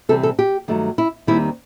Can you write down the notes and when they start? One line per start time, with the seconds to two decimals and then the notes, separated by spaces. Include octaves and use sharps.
0.09 C3 E3 G3 C4 A4
0.23 A4
0.39 G4
0.68 G2 D#3 F#3 A3
0.98 E4
1.27 D#2 D#3 G3 C4 E4